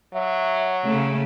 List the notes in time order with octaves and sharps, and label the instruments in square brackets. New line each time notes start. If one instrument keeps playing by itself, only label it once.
[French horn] F#3 [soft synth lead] E5
[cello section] C#3 A3 [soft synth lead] C#5